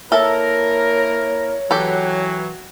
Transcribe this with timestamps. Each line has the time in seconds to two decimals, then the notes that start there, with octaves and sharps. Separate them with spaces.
0.12 A#3 E4 A4 A#4 C#5 E5 A5
1.71 E3 F#3 G4 A4